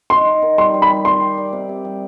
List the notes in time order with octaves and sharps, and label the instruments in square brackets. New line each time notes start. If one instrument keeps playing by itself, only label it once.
[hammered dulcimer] D#4 [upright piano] C6
[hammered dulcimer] D#4
D#3
[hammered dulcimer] G3 [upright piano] C6
[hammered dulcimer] G3
[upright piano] B5
[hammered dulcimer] G3
[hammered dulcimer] G3 [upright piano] C6
[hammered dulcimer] G4
D5
C3
C3
G3